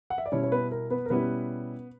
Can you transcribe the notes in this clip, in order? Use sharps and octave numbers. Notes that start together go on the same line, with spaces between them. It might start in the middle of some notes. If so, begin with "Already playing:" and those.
F#5
E5
D5
B2 G3 C#4 E4 C#5
C#5
B3 B4
A#4
B3 B4
A#4
B2 G3 B3 C#4 E4 B4